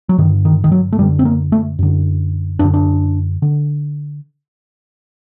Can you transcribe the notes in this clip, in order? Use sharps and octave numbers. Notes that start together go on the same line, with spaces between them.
F#3
G2 D3 D#3
D#3
D#3
F#3
A3
F#2 D3 G3
C4
A#3
A3
F#2 D3
F#2 D3 D4
D4
D3